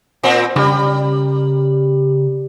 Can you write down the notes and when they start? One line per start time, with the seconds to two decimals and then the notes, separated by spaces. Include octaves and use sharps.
0.23 A#2 C4
0.56 C#3 G3 A#4 B5